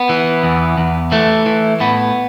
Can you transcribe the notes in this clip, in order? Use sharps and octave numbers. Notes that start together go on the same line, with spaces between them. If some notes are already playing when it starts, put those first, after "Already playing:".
Already playing: B3
E3
E2
E2
E3 A3
E3
A2 B3